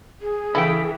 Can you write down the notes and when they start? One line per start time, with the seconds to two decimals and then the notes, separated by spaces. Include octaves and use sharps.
0.22 G#4
0.55 C#3 E3 E4 A4 G5